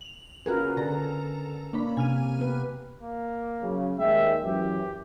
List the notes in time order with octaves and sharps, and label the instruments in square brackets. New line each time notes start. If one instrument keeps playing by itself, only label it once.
[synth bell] F7 F#7
[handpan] C#4 A#4 B4 [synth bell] F4 F#4 G#4
[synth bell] D3 A4 A#5
[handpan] A#3 [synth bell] C#4 D4 B5
[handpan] C3 [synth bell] G#5 F6 D#7
[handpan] B3 G4 B4
[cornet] A#3
[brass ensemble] F#2 C#3
[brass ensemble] D#2 G#3 G5 [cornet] E5
[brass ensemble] F#2 E3 [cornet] G4